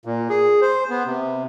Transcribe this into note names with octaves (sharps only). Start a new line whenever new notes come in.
A#2
G#4
C5
B3
C3